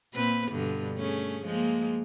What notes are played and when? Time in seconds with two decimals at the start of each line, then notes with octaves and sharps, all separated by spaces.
0.14 A#2 C4 B4
0.51 G2 B2 D3
0.96 A3 C#4 G#4
1.45 F3 G#3 A#3